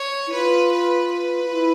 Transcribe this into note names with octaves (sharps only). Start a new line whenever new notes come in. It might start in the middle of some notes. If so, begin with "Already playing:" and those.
Already playing: C#5
E4
F4 B4
B4
B4
F4
E4